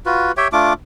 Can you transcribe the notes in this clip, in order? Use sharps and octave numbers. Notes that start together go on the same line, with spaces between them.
F4 F#4 B4
G4 C#5 E5 G5
A3 D4 F4 D6